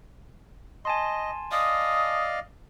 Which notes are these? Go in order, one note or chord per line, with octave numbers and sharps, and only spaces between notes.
D#5 G#5 A5 C6
D5 D#5 F5 D#6